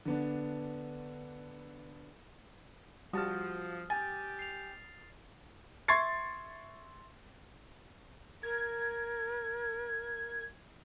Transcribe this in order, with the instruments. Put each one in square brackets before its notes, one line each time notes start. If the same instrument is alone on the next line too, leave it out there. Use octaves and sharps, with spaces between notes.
[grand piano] D3 B3 D4
[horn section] F3 [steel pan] G3 A5 [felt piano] F#4 [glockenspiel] D#6 F6
[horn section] G4 G5 [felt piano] G#5 [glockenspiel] A6
[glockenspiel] C7 F7
[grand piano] E5 C6 C#6 G#6 A6 C7
[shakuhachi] A#4 [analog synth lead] G#6